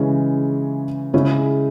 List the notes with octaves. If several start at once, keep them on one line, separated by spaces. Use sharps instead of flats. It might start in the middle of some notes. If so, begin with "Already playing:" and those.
Already playing: C#3 E3 G#3 C#4
C#3 G#3 C#4 E4